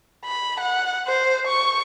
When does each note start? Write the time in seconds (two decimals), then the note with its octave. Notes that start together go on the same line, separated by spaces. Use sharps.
0.25 B5
0.60 F#5
1.07 C5
1.47 C#6